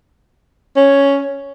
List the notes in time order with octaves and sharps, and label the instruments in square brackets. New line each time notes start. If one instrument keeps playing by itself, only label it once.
[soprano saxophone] C#4